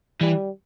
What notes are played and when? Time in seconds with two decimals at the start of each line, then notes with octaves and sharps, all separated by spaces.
0.21 E3 G3